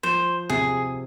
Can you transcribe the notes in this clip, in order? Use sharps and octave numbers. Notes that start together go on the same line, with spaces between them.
F3 C5
C3 G#4